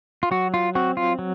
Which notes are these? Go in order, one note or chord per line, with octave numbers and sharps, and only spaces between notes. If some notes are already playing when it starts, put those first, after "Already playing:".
F4
F#3 F#4
F4
C4 F#4
F4
F#3